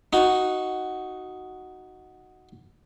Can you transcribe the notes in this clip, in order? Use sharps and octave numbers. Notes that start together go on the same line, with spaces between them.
D#4 F#4